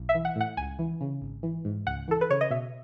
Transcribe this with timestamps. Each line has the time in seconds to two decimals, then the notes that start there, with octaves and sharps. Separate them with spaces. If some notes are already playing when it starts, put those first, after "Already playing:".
Already playing: B1
0.09 E5
0.15 E3
0.25 F#5
0.35 A2
0.41 F#5
0.57 C#2 G#5
0.79 E3
1.01 C#3
1.22 G#1
1.43 E3
1.65 G#2
1.86 C#2 F#5
2.08 E3 A4
2.21 B4
2.30 C#3 C#5
2.41 D#5
2.51 B2 E5